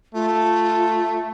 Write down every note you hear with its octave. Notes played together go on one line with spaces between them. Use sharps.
A3 F4